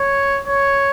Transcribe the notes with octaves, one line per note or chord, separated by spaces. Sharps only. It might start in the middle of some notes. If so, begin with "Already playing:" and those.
Already playing: C#5
C#5